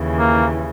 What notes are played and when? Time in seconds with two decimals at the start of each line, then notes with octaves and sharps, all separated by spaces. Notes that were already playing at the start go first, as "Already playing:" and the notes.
Already playing: D#2 C#3 E3
0.19 A#3